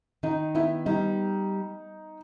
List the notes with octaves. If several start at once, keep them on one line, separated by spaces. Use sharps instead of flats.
D#3 D#4
B3 E4
G3 D#4